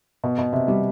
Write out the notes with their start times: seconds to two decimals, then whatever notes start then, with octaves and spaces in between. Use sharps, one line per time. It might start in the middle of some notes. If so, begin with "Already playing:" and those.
0.24 B2
0.39 B2
0.53 C3
0.68 G3